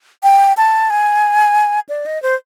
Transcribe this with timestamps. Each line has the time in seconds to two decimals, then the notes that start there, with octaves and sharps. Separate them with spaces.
0.23 G5
0.57 A5
0.90 G#5
1.89 D5
2.06 D#5
2.23 C5